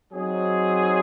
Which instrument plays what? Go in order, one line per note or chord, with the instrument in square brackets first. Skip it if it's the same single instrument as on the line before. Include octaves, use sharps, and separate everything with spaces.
[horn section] F#3 C4 D#4 G#4